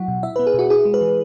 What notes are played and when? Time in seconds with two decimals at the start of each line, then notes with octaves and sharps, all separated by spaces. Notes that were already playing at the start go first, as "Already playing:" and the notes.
Already playing: F#3 E4 F#5
0.08 B2
0.23 E4 E5
0.36 B3 B4
0.47 G#4
0.54 B2 F#4
0.70 E4 G#4
0.85 G#3
0.94 B4
1.01 E3